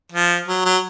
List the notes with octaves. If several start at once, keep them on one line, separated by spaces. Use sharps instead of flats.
F3
F#3
F#3